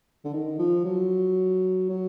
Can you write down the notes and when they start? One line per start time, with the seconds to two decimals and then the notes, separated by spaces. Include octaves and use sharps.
0.25 D3
0.33 D#3
0.59 F3
0.85 F#3
1.89 F#3